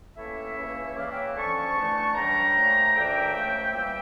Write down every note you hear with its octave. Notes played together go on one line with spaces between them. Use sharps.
A2 E3 A#3 C#4 C#5 E5
C#2 C#3 E3 A#3 C#4
C#2 C#3 E3 A#3 E4 D5 F5
E5 G5
F2 D3 F3 C#4 A5 C#6
E2 E3 A3 D4
C#2 C#3 G3 D4 G5 A#5
A#2 F3 A3
D2 C#3 E3 A#3 D4 E5 G5
C#2 C#3 F3 A3
E2 E3 G3 A#3 E5 G5